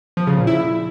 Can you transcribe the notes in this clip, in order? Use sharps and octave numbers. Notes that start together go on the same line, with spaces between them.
F3
C#3
A#2
E4